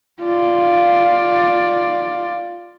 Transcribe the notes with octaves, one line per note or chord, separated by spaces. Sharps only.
F4 D5